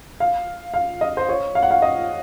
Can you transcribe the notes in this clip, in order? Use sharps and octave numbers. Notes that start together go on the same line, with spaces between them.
F5
F5
D#5
C5
C#5
F5
F#5
F5
D#5